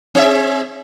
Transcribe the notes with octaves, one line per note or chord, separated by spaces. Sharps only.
C4 G#4 E5